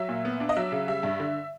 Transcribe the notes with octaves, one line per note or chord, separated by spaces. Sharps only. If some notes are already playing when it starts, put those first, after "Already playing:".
Already playing: F#3 E5
A#2
B3
D4
D#5
F#3 E5
C#3
G3 E5
G2
D3